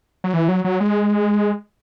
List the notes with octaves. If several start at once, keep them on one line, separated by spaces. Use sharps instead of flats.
F#3
E3
F#3
F#3
G#3